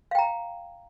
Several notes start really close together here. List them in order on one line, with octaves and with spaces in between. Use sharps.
F5 G5 A#5